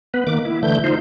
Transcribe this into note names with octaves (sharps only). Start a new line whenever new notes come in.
B3 B4
D#3 A#3 D6
E4
D3 E3 A3 G6
D#4 F4 C5